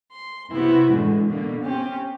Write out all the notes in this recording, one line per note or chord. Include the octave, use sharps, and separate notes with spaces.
C6
C3 B3 C4 E4 F#4
A2 D3 E3 G#3
B2 D3 A#3
C4 C#4 G4